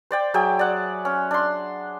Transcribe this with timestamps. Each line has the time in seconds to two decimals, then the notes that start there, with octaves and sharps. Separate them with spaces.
0.11 C5 D5 G5
0.34 F#3 G#4 E5 G5
0.59 D5 F#5
1.05 C#4
1.31 D4 C6